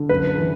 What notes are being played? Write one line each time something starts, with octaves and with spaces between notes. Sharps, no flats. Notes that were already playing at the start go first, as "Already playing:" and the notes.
Already playing: D3
F#2 B4
E3